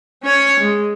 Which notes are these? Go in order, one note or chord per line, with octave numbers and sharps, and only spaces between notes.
C#4 C#5
G#3